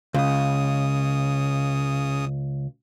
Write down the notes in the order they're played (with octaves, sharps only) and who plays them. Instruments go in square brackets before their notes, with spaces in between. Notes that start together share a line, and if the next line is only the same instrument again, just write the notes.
[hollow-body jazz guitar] C#2 [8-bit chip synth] C#3 D#6